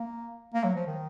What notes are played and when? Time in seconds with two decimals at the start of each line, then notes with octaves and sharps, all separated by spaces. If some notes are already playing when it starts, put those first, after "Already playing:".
Already playing: A#3
0.54 A#3
0.64 F#3
0.75 F3
0.87 D#3